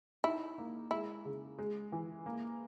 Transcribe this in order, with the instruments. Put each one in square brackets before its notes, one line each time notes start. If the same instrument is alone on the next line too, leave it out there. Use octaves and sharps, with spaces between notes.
[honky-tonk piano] D#4 [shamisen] E4
[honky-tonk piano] A#3
[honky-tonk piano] G#3 [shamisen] E4
[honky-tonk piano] C#3
G#3
E3
A#3